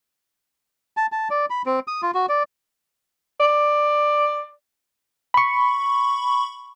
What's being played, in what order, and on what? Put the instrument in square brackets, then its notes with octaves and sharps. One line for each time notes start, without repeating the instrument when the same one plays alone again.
[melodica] A5
A5
D5
B5
C4
D#6
F4
F#4
D5
[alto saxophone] D5
[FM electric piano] B5 C#6